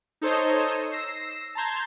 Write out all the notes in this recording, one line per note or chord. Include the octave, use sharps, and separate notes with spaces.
D#4 A4 C5 C#5 D#5
E6 A#6 C7
A5 A#5 C6 G6 G#6